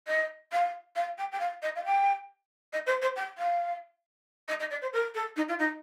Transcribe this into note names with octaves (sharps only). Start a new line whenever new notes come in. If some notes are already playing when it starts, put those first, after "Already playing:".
D#5
F5
F5
G5
G5
F5
D#5
F5
G5
D#5
C5
C5
G5
F5
D#5
D#5
D5
C5
A#4
A4
D#4
F4
D#4